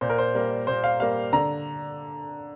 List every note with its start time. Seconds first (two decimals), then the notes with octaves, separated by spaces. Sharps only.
0.01 A#2 C5
0.10 A#4
0.18 C5
0.34 G3 A#3
0.67 A#2 C5
0.84 F5
1.00 G3 A#3 F5
1.33 D3 A#5